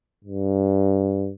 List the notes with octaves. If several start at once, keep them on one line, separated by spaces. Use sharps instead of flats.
G2